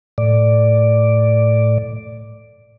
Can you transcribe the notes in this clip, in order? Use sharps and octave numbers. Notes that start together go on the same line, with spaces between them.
A2 D5